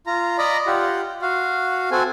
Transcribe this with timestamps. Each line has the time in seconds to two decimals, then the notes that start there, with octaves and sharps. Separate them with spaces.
0.07 F4 A#5
0.38 D5 D#5 A#5 B5
0.67 F4 G4 F#5
1.22 F#4 F5
1.91 C4 F#4 A4 G#5